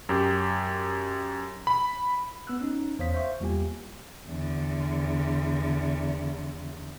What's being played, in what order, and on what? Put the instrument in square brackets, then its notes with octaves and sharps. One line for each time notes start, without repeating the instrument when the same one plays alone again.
[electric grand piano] F#2 G4
B5
[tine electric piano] B3 E6 F#6
C#4 D#4
E2 C5 C#5 F5 D#6 B6
C5 E5 F5 C#6
E2 G3 A#3 F4 G4 G#5
[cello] E2 D3